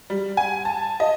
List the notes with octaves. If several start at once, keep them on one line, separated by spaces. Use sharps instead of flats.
G3
G#5
A5
D#5